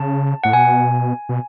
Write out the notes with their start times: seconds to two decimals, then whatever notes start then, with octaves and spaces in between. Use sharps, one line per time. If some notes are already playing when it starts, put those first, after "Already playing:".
Already playing: C#3 A5
0.44 A2 F#5
0.53 B2 G#5
1.29 B2